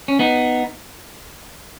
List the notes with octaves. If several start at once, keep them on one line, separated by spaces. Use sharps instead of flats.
C#4
B3 D#4